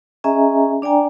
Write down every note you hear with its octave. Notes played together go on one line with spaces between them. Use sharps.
C#4 G#4 D#5 E5 G#5 A#5
D4 D5 G5 G#5 A#5